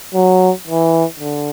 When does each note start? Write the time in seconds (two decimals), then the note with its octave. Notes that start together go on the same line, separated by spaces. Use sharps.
0.14 F#3
0.67 E3
1.20 D3